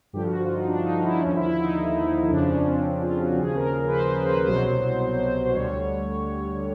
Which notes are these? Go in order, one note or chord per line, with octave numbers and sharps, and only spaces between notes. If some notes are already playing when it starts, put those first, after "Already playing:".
G2 D3 F3 G4
F#4
F4
D#4
D4
D#4
E4
D#2 D3 F3 C#4
E4
E4
D#4
F2 C#3 F3 D4
C#4
C4
D4
F4
F#4
D#2 C#3 F3 G#4
A#4
B4
C5
C5
B4
C2 B2 F#3 C5
D2 D3 G3 C#5